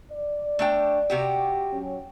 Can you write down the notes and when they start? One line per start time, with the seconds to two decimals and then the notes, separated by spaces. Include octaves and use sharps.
0.11 D5
0.59 A3 D4 G5
1.10 C3 F#4 G4
1.72 F#3 C#4